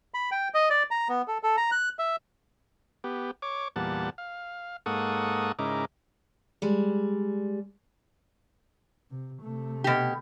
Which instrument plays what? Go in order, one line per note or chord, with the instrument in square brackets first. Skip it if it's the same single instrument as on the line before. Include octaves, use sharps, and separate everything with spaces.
[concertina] B5
G5
D#5
D5
A#5
B3
A4
A4
A#5
F#6
E5
[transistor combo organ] B3 G4
C#5 D6
E2 A#2 G3 F#5 A5
F5
G#2 A#3 A4 F#5 C#6 D#6
G#2 C#3 D#4 E4 A#4 D6
[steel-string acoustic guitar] G3 G#3
[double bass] C3
C3 A3
[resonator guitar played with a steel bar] B2 G4